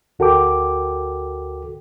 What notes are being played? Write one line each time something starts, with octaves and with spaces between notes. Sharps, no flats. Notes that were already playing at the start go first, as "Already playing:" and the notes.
D2 F#4 A4 A#4 G5 D6